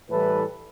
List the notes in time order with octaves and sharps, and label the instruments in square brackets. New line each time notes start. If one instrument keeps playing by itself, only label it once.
[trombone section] A2 E3 G3 A4 B4